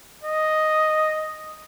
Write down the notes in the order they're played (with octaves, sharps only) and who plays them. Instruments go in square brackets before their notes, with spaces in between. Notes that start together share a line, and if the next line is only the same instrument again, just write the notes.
[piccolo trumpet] D#5